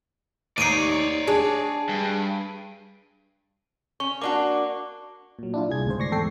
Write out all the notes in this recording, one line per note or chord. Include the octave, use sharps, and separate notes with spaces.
D#2 D#4 C#5 D5 C7 D7 D#7
D4 G#4
G2
C#4 C#6
A#3 D4 F#4 D6
A#2 F#3
D4 E4 F4
C2 G#4 G#6
D2 G#2 C5
D5 C#6 A#6 C7
E2 G#2 A4 G5 C7